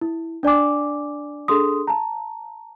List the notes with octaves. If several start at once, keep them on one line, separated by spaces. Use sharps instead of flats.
E4
D4 D5 G#5 D6
D4 G#4 A4 C6 D#6
A5 A#5